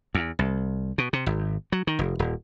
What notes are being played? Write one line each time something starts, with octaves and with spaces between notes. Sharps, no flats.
E2
C2
B2
C3
G#1
F#3
D#3
F1
D#1